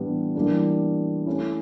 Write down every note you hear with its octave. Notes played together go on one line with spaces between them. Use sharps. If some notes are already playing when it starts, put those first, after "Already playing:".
Already playing: A2 E3 G3 B3 D4
E3 G3 A#3 D4
A3 C#4 E4